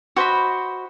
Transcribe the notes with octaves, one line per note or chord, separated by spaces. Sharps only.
F#4 C5 D#5 B5